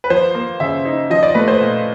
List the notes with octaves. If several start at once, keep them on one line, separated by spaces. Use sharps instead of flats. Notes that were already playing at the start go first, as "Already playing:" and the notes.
B4
F3 C5
A#3
C#3 E5
D#4
F3 D#5
D5
A3 B4
C5
A#2